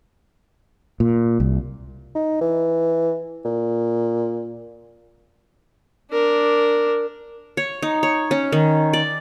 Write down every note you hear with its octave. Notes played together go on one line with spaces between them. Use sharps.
A#2
C2
D#4
E3
A#2
D4 A#4
C#5
D#4
C#5
C#4
D#3
D5